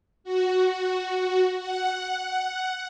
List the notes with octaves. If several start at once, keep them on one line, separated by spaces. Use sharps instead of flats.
F#4
F#5